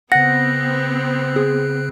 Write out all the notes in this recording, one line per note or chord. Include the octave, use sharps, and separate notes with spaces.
C#3 B3 C4 F#5 F#6 A#6
G#4